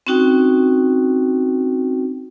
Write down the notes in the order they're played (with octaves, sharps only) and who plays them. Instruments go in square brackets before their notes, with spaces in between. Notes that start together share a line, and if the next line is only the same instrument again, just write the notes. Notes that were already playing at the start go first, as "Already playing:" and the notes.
[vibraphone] C4 C#4 D#4 F#4 G5